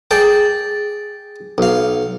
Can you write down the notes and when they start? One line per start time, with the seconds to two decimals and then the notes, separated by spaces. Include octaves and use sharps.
0.11 G#4 D5 G5 A5
1.58 B1 F5